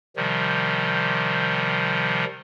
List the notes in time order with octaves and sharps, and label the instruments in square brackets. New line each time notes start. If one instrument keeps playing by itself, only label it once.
[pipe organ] C3 D#3 F3 G3